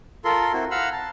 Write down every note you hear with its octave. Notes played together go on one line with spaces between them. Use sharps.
F4 A4 A#4 C6
C4 E4 F#4
F5 F#5 A#5 B5 E6 F6
A5